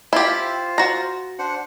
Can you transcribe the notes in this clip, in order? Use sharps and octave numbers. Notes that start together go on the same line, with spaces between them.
E4 F4 G4 F5
F4 C5
F#4 A#5
D4 C5 F#5